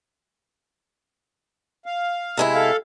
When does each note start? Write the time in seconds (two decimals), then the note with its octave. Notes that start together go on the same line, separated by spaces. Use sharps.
1.86 F5
2.37 C3 G#3 E4
2.55 A4 F5